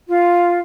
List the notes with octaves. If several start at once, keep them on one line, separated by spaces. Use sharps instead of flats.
F4